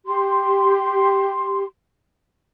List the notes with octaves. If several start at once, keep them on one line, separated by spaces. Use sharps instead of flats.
G4 C6